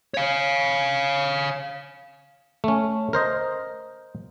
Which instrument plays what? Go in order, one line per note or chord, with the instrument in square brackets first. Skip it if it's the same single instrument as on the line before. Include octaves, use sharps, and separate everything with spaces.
[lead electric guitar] C#5 F5
[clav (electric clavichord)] A3 C#4
A#4 C5 D#5